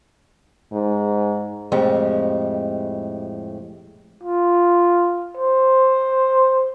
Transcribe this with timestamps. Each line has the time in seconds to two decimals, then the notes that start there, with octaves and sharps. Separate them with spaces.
0.72 G#2
1.72 F2 A2 G#3 G4
4.23 F4
5.37 C5